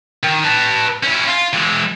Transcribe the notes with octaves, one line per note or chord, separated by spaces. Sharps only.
D#3
B4 A5
C#4 E4
F4
E3 G#3